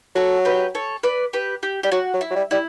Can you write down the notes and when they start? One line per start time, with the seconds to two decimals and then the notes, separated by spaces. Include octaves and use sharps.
0.15 F#3 F#4 A4
0.45 G4 B4
0.75 A4 C#5
1.03 B4 D5
1.33 G4 B4
1.63 G4
1.83 G3 G4
1.92 F#3 F#4
2.14 F#3
2.21 E4
2.31 F#3
2.36 G3
2.51 G3 E4